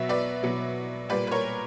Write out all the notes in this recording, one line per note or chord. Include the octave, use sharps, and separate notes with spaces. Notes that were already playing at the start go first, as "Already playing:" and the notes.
Already playing: B2 F#3 B3 E5
B4 D5
B2 F#3 B3
A#2 G3 A#3 B4 D5
B4
A#4 C#5